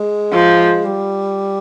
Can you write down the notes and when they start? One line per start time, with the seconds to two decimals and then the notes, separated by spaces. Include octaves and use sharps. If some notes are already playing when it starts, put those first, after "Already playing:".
Already playing: G#3
0.33 F3
0.85 G3